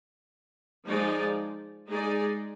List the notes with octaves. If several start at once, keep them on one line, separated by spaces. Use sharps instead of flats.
F3 G#3 D#4 G#4 D5
G#3 D#4 G#4 D5